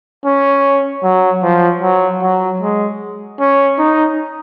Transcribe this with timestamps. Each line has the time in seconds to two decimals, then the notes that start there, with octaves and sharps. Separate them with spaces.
0.25 C#4
1.03 F#3
1.43 F3
1.82 F#3
2.22 F#3
2.62 G#3
3.40 C#4
3.79 D#4